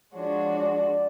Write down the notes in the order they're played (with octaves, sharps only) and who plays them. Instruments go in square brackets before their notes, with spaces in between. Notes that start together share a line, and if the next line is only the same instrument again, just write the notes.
[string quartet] F3 G#3 D4 F#4 [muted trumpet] C#5
[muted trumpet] D5